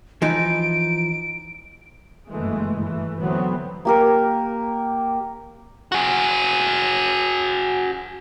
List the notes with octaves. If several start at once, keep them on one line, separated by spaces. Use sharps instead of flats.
E3 F3 D#4 D7
F#1 G2 E3 G#3 A3
E3 A3
D2 E3 F#3 B3 C4
A#3 G4 A#4
F#4 G#4